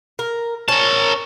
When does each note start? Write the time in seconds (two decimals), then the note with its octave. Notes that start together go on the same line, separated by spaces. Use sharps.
0.19 A#4
0.69 C#4 A#4 A5